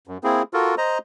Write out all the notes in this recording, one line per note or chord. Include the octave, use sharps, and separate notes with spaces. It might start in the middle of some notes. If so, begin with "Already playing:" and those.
F#2
A#3 C4 E4 G#4
F4 F#4 A4 A#4
C5 D#5 A#5